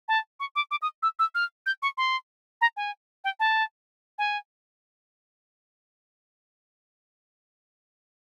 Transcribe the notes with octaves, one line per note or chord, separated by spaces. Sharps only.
A5
C#6
D6
D6
D#6
E6
E6
F6
G6
C#6
C6
A#5
G#5
G5
A5
G#5